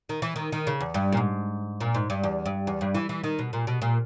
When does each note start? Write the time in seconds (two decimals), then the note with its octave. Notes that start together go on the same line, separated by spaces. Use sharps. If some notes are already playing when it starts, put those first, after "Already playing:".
0.09 D#3
0.22 E3
0.36 D#3
0.52 D#3
0.67 C#3
0.80 E2
0.94 G2
1.12 A#2
1.17 G#2
1.80 A#2
1.94 G#2
2.10 G2
2.23 E2
2.46 G2
2.67 E2
2.81 G2
2.95 E3
3.09 E3
3.23 D#3
3.39 B2
3.53 A#2
3.67 B2
3.82 A#2